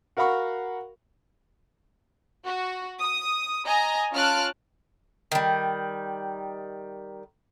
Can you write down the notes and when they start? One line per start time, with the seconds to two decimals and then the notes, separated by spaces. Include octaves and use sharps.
0.17 F#4 A#4 F5 F#5 B5 C#6
2.46 F#4
2.99 D#6
3.66 D#5 G#5 A#5
4.13 C#4 F4 A5 F6 F#6 D7
5.32 D#3 G3